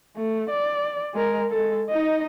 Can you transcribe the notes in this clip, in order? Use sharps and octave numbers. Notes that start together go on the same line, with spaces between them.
A3
D5
G#3 A#4
G#3 A4
D#4 D#5